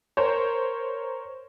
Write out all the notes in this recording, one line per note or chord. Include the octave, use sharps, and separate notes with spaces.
A#4 C5 C#5